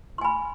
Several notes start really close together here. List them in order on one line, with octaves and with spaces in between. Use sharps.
C6 G#5 B5